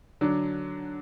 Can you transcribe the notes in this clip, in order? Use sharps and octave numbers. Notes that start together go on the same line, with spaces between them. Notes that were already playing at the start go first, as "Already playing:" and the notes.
D3 F#3 D4